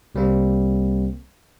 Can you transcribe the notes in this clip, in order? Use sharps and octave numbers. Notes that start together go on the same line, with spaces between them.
C2 G3 A#3 C4